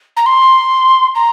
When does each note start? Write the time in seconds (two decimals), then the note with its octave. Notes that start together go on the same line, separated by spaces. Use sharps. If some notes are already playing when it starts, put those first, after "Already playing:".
0.17 A#5
0.26 C6
1.15 A#5